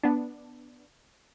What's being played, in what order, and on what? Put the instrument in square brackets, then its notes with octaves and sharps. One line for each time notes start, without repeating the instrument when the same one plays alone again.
[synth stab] B3 D4